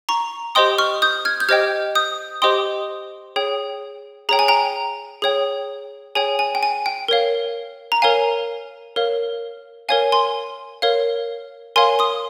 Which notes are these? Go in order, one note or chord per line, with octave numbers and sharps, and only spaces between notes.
A#5 C#6
G4 C5 D#5 G5 C6 D#6
C#6 F6
D#6 G6
F6 G#6
G6
G4 C5 D#5 G5 F6 G#6
D#6 G6
G4 C5 D#5 G5 C6 D#6
G#4 C#5 G5
G#4 C#5 G5 A#5
G#5
G5 A#5
G#4 C#5 G5
G#4 C#5 G5 G#5
G#5
G5
G#5
G5
A#4 C#5 F5
A#5
A#4 C#5 F5 G#5
A#4 C#5 F5
A#4 C#5 F5 G#5
G#5 C6
A#4 C#5 F5
A#4 C#5 F5 G#5 C6
C6 D#6